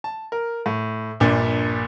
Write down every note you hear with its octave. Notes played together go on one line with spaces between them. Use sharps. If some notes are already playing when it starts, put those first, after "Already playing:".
A5
A#4
A2
A#1 G2 A#2